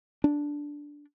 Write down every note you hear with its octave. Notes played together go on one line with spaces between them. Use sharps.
D4